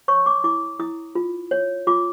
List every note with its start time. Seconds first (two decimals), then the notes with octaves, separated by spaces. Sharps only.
0.08 C#5 C#6
0.26 D6
0.44 E4 D6
0.80 E4 D#6
1.15 F4
1.51 C#5
1.87 F4 D6